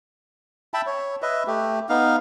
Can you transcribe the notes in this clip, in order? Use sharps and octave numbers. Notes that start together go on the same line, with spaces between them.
E5 G5 A5 B5
C#5
B4 D#5 E5
A3 G4
B3 D#4 F5